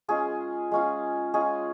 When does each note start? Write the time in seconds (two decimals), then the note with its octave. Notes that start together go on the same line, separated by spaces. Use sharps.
0.08 G#3 C#4 F4 G#4
0.71 G#3 C#4 F4
1.34 G#3 C#4 F4 G#4